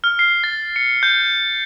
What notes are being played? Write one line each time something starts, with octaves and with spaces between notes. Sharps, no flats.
F6
C7
A6
C#7
G6